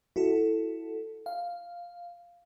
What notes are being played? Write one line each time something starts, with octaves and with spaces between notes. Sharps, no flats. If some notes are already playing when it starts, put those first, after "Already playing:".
E4 F#4 A4
F5